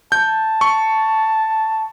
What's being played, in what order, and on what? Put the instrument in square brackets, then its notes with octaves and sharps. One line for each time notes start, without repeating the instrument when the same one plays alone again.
[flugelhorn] A5 [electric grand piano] G6
[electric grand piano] C#6